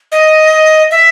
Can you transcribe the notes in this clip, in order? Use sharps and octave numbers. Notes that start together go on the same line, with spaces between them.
D#5
E5